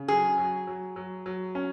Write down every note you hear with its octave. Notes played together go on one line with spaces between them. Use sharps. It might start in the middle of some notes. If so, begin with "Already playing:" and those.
Already playing: C#3
F#3 G#4
F#3
F#3
F#3
F#3
C#4